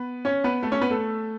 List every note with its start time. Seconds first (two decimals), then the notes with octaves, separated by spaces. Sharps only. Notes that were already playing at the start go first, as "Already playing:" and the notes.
Already playing: B3 B4
0.25 C#4 C#5
0.44 B3 B4
0.63 A3 A4
0.72 C#4 C#5
0.81 B3 B4
0.91 A3 A4